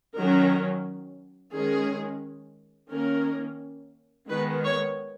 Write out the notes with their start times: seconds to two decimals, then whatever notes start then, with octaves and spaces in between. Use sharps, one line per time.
0.16 D#3 F#3 C#4 A#4
1.53 D#3 G#3 C#4 G#4
2.90 D#3 A#3 C#4 A#4
4.28 D#3 G#3 B3 B4
4.63 C#5